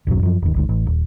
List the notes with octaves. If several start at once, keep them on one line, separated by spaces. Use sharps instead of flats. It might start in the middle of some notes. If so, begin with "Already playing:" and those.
D1 B1 F#2 F#3
F#2 F3
F1 D#2
G#1 D2 G#2
A1
D#1